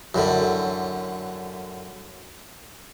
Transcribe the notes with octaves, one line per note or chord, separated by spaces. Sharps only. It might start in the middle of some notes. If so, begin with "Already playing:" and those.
F#2 A2 D3